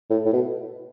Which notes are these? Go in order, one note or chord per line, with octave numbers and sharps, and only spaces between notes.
A2
A2
B2